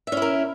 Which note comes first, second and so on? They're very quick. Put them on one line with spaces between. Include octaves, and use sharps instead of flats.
E5 C#4 E4 A#4